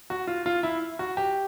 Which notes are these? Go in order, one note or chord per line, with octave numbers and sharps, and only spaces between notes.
F#4
F4
F4
E4
F#4
G4